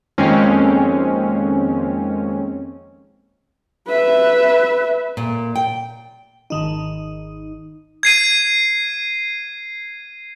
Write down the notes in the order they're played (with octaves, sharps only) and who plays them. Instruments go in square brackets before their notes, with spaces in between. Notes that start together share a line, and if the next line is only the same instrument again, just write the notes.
[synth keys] F2 D#3 G#3 A#3 C4 C#4
[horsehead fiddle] B4 E5
[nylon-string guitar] A#2
G5
[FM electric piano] G#1 D#3 D#4
[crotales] G#6 C7 D#7